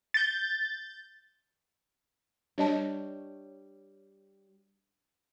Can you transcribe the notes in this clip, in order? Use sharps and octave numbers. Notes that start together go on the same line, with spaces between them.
G6 A6
G3 D4 C#5 D#5 A5